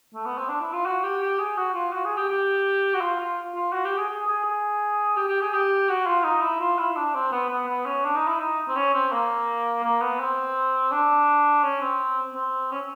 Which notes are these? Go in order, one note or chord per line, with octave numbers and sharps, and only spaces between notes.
A3
B3
C4
D4
E4
F4
F#4
G4
G4
G#4
F#4
F4
F#4
G#4
G4
G4
F#4
F4
F4
F4
F#4
G4
G#4
G#4
G#4
G#4
G4
G4
G#4
G4
F#4
F4
D#4
E4
F4
E4
D4
C4
B3
B3
B3
C#4
D4
D#4
E4
D#4
C4
C#4
C4
A#3
A#3
B3
C4
D4
C#4
C4
C4
C#4